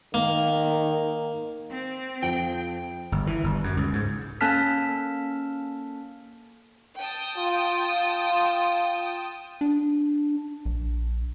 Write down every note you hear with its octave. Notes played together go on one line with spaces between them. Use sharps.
D#3 A#3
C4
F2 F3 G5
G1
E3
G1
F#2
C#2
G#2
A#3 C#4 A4 A5 F6 B6
G5 A5 D#6
F4
D4
A#1